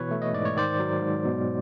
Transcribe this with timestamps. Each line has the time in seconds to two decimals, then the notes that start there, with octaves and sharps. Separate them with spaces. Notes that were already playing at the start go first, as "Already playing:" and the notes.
Already playing: B2 E3 B4 C#5
0.11 A3
0.22 D#5
0.33 G#2 D5
0.45 C#5
0.56 D#3 C5 D5
0.79 F#3
1.01 G#2
1.25 B2